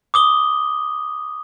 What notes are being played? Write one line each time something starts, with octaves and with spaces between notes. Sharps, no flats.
D6 D#6 G7